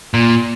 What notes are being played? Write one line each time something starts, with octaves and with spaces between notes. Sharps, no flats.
A#2